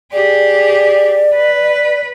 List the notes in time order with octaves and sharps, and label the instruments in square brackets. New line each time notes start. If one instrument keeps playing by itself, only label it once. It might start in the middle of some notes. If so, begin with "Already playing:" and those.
[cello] G4 G#4 [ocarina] D5
[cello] B4